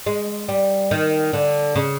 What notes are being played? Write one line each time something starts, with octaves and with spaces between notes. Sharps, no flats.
G#3
G3
D#3
D3
C#3